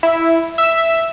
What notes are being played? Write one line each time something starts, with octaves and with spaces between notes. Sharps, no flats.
E4
E5